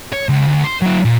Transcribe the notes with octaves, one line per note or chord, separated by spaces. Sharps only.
C#5
C#2
D2
C5
F#3 E4
A#2